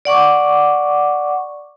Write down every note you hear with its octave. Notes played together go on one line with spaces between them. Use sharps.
D5 F#5 C#6 D6